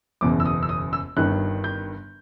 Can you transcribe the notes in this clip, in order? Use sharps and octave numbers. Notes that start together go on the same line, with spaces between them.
F#1 E2 B2 D6
E6
D#6
E6
D#6
E6
G1 G2 D#3 F#6
G6